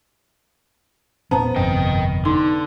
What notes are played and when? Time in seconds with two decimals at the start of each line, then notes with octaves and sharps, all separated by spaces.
1.31 E1 A#2 B3 C#4 C5 A5 A#5
1.56 G1 F2 C3 D#5 G5
2.25 D3 D#4 C6